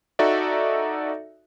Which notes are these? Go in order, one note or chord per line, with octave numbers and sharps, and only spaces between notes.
D#4 F#4 A4 D5 E5